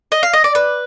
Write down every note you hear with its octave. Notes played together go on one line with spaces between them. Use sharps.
D#5
F5
D#5
D5
B4